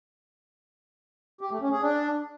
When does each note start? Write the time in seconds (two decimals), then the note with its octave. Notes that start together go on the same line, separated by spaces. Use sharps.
1.41 G4
1.51 A3
1.61 C#4
1.72 G#4
1.82 D4